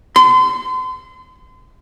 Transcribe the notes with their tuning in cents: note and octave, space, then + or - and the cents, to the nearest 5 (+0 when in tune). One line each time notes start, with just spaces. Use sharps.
C6 -35